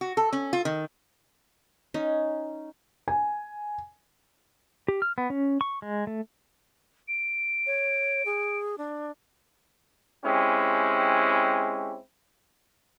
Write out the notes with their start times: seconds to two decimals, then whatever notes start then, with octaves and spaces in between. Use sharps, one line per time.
0.01 F#4
0.17 A4
0.33 C#4
0.53 F4
0.65 D#3
1.94 C#4 D#4
3.08 G#5
4.88 G4
5.02 F6
5.18 B3
5.30 C#4
5.61 C#6
5.82 G#3
6.07 A3
7.08 D7
7.67 C#5
8.26 G#4
8.78 D4
10.25 G#3 C4 C#4 E4 G4